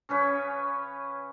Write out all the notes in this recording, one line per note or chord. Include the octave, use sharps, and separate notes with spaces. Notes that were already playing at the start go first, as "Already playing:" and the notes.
C#3 C#4 B4 G#5